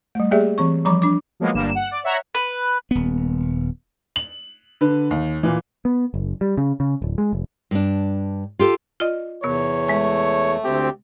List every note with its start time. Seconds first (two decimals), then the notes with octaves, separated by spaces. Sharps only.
0.15 G3 A3
0.31 A#3 G4 G#4 D5 E5
0.58 E3 C4 C#6
0.85 F3 G3 A#5 B5 C#6 D6
1.02 D4 D6
1.40 F3 F#3 G#3 A#3 B3
1.53 G1 G2 A#3 E7
1.75 F#5
1.91 D5
2.03 C#5 E5 F#5 A#5
2.35 B4
2.91 D#1 B3
4.16 F#7
4.81 D3 B4
5.11 D#2
5.43 A#2 E3
5.85 B3
6.14 F#1
6.41 G3
6.58 C#3
6.80 C#3
7.02 D1
7.18 G#3
7.33 F1
7.71 G2 D4
8.59 F4 G4 A4
9.00 F4 D5 D#5
9.44 E2 C3 B3 A#4 C#5
9.88 G#3 A3 G#5
10.64 D2 C4 G4